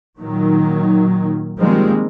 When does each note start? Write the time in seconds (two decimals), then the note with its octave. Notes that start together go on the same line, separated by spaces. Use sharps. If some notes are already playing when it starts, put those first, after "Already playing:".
0.19 A#2 D#3 F#3
1.59 D#3 F3 G3 G#3 A#3 C4